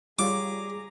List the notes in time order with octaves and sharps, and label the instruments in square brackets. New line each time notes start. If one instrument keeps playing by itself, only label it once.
[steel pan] G3 F4 C#5 [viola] G#4 A#5 [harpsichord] D6